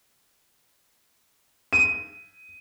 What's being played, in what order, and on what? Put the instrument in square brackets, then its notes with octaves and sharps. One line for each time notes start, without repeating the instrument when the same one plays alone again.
[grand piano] D#7